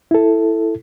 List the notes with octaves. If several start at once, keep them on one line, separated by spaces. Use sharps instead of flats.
E4 A4